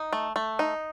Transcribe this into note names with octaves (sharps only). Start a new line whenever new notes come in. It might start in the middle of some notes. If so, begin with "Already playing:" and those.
Already playing: D#4
A3
A3
D#4